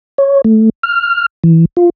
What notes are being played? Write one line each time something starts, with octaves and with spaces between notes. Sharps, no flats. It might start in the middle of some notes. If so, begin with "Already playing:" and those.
C#5
A3
F6
E3
F4